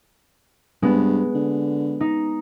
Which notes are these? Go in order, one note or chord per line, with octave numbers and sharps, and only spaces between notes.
G2 G#3 B3
D3
D#4